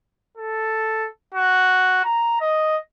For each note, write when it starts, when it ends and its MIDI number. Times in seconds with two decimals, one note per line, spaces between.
0.37 1.07 69
1.34 2.01 66
2.05 2.37 82
2.40 2.78 75